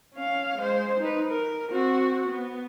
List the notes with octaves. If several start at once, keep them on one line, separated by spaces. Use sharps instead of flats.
C#4 F5
G#3 C5
D#4 B4
A#4
C4 F#4
B3